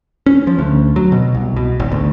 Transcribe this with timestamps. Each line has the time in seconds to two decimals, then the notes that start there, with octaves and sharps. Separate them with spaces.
0.26 C#4
0.47 F3
0.59 D2
0.96 F#3
1.12 B2
1.35 C2
1.56 B2
1.80 G#1
1.92 D2